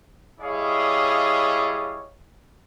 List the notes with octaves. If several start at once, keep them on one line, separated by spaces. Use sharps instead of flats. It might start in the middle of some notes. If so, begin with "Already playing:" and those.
G3 E4 G#4 C#5 D#5 F5